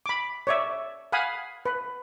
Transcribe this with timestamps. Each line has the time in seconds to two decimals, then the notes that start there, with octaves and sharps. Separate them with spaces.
0.06 B5 D6
0.47 C#5 D5 E5
1.12 F5 F#5 G#5 B5 D#6
1.66 B4